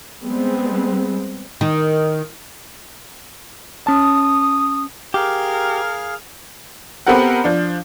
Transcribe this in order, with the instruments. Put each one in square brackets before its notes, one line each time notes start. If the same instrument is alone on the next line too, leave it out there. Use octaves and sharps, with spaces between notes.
[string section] G3 G#3 B3 C4
[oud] D#3
[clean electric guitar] C#4 A5 [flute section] D#6
[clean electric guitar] G4 [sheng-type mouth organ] G#4 F5 F6 [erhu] A#4
[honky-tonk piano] B3 C4 G4 A4 A#4 F#5
F3 D4